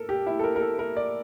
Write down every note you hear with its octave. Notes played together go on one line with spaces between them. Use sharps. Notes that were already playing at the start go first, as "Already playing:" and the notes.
Already playing: A4 A#4
G4
E4
A4
A#4
A#4
A4
A#4
D5